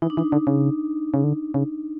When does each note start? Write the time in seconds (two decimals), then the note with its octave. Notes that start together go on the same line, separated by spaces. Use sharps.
0.02 E3 D#4
0.10 D4
0.17 E3 D#4
0.32 D3
0.47 C#3
1.14 C#3
1.24 D3
1.54 C#3